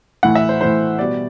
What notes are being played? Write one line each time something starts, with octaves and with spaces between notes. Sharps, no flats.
A2 E3 A3 F#5
E5
C5
A2 E3 A3 C5
B2 G3 B3 D5